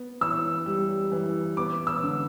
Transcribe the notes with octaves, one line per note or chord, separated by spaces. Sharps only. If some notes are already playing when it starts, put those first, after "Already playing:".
Already playing: B3
E3 E6
G3
E3
B3 D6
E6
D3